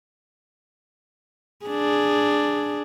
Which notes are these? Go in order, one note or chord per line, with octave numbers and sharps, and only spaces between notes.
D4 G#4